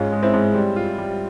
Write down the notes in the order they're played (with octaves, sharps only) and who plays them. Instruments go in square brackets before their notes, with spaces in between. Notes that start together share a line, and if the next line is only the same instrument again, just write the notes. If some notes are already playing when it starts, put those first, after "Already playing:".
Already playing: [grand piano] G#2 [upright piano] C#4 F4
[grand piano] G#3
[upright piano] C4 E4
[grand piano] G#2
G3
F4
G3